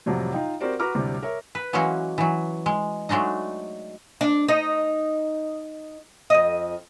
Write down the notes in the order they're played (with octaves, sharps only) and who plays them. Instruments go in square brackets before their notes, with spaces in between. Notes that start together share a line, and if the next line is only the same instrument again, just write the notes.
[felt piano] A1 F2 C3 F#3 G3
D#4 F4 D#5 G5
C4 F#4 G4 A#4 C5 D5
F#4 B4 A#5 D6 F6
D2 A2 C3 G3
A#4 C#5 E5
[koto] B4
E3 F#3 G#3 A#3 C#4 F#4
E3 F#3
G#3
F#3 G#3 A3 D4 D#4
[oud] D4
D#4 D#5
F2 D#5